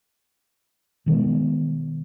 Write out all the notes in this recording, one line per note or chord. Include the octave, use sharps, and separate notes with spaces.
B2 D#3 G#3 B3